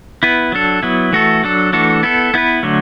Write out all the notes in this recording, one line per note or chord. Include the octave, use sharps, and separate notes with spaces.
B3 E4 B4
F#3 D4 A4
F#3 B3 E4
E3 A3 F#4 A4
F#3 D4 A4
E3 A3 D4 F#4 A4
B3 E4 A4
B3 E4 B4
D3 F#3 A3